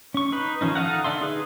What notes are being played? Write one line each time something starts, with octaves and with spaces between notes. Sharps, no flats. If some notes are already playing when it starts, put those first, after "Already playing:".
C#4 C#6
D#4 B4 B5
D#3 F3 C#4 D#4
D#4 A4 D#5 F5 F#5
D3 D5 E5 C6
D#4 G#4 B4